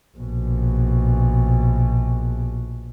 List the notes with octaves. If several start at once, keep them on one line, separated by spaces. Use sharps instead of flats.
A#1 B2